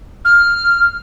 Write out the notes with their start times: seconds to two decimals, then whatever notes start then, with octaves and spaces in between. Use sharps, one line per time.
0.25 F6